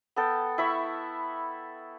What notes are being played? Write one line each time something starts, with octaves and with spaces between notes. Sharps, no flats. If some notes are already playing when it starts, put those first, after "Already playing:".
B3 A4 G5
E4 E5 B5 C#6